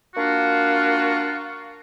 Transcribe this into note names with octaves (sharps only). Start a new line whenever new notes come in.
A#3 D4 F4 F#4